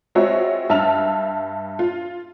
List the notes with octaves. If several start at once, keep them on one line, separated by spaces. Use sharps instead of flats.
G#3 C4 F4 F#4 C#5 E5
G2 E5 A5 F6 F7
F4